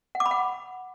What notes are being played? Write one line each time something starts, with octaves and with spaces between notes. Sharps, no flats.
F#5
D6
B5
F#5